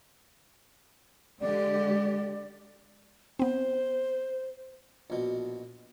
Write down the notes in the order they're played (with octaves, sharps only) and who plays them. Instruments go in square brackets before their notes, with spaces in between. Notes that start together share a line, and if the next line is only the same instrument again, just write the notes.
[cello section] D3 G#3 G4 [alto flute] D5
[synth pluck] B3 C4 [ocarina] C5
[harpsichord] A#1 B2